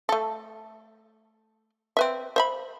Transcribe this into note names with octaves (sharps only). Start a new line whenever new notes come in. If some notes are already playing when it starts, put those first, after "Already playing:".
A3 A4
C4 B4 E5
C5 E5 B5